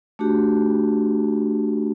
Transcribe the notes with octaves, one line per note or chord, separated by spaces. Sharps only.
A3 D4 F#4 G4